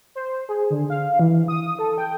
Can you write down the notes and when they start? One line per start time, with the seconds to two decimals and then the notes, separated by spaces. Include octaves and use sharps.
0.15 C5
0.49 G#4
0.71 D3
0.90 F5
1.19 E3
1.48 D#6
1.79 A4
1.98 G5